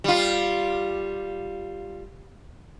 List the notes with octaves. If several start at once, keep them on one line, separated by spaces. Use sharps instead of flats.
G3 F4